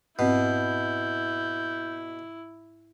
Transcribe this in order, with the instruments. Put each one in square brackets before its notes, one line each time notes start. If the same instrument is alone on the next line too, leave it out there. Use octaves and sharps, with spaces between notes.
[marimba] G#2 C4 [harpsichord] B2 [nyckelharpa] E4 [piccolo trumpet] G6